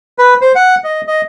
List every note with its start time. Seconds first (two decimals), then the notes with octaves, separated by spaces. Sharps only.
0.18 B4
0.41 C5
0.55 F#5
0.84 D#5
1.07 D#5